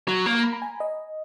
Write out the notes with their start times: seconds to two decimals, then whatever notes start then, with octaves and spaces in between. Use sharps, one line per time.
0.08 F#3 A#5
0.25 A#3 A#5
0.43 B5
0.53 A#5
0.62 G#5
0.80 D#5